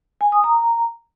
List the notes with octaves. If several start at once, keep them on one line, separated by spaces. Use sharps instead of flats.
G#5
D#6
A#5